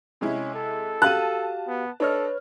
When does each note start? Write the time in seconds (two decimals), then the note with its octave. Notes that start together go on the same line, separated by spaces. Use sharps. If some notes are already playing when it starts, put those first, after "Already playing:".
0.21 C3 G#3 C#4 E4
0.55 A4
1.02 F#4 G4 F5 A5 F#6 D#7
1.68 B3
2.00 D4 A4 B4 C#5 D#5 F6